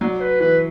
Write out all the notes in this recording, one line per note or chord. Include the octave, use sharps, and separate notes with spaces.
F#3 D5
B4
E3 B4